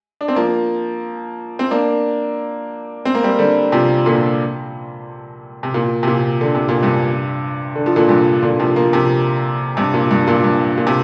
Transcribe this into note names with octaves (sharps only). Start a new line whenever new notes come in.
D4
C4
F3 A#3
C4
A#3 D4
C4
A#3
G3 C4
D3 G3
C3 F3
A#2 D3
C3
A#2
C3
A#2
D3
C3
A#2
G2 C3
D3
F3
A#2 D3
G2 C3
A#2 D3
C3 F3
F3 A#3
C3 F3
G2 C3
A#2
G2
A#2
G2
A#2
C3